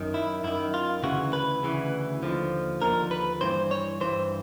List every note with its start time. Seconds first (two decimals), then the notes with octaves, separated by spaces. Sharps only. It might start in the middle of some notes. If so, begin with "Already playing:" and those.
Already playing: F#2 D#3
0.14 E4
0.44 F#2 D#3 E4
0.74 F4
1.03 D2 C#3 E3 F#4
1.33 B4
1.63 D2 C#3 E3
2.23 D#2 D3 F3
2.82 D#2 D3 F3 A#4
3.11 B4
3.41 G2 E3 C5
3.71 C#5
4.01 G2 E3 C5